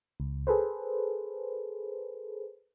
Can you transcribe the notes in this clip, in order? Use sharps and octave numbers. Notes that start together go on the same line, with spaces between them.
C#2
G#4 A4 B4 C5